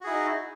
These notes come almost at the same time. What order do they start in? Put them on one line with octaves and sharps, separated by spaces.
F#4 G#4 E4 D#4